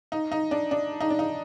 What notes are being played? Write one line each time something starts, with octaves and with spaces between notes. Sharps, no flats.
D#4
D#4
D4
D4
D#4
D4
D#4